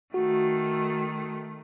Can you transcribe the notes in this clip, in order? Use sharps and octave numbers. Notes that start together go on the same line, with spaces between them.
D#3 A3 F#4